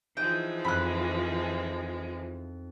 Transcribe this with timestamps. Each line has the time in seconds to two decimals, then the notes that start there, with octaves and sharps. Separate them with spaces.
0.17 E3 F3 G#3 D#4 G5
0.65 F2 B3 B5 F#6 G#6